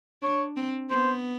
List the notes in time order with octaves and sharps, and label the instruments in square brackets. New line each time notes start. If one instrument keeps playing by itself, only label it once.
[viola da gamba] D4 [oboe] C#5
[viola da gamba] C4
[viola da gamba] B3 [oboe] C5